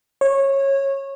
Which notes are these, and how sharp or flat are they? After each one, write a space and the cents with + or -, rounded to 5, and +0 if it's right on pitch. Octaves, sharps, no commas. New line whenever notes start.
C#5 -20